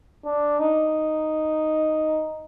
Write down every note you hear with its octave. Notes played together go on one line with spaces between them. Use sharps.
D4
D#4